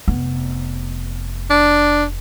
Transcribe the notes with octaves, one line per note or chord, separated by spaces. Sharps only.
F1 B3
D4